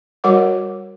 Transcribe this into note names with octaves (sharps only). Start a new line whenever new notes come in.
G3 F#4 A#4 C#5 F#5 D6